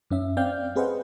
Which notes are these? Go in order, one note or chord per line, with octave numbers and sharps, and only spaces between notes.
F#2 C#4 E5
C4 D5 F5 G5 F6 G6
C4 G#4 B4 C5 D#5 F#5